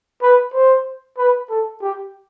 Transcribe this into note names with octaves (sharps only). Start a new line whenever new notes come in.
B4
C5
B4
A4
G4